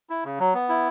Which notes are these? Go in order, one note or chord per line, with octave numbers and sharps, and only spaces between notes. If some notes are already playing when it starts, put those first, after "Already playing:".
E4
C#3
F#3
B3
E4